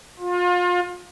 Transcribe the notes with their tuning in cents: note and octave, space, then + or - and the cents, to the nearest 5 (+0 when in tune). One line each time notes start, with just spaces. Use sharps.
F4 +30